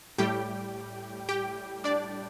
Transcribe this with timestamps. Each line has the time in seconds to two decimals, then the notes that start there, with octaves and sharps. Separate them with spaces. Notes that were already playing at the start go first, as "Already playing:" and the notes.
0.18 A2 G3 G4 G5
1.29 G4 G5
1.84 D4 D5